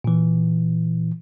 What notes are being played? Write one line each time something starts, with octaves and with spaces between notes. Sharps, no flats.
A#2 E3